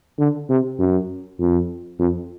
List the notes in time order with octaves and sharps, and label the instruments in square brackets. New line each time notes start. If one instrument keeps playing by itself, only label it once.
[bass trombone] D3
C3
F#2
F2
F2